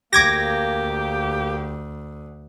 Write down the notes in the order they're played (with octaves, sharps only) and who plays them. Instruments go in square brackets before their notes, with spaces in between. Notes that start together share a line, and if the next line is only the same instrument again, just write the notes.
[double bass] D2 [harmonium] A#3 [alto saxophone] G4 [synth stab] D6 G#6 A#6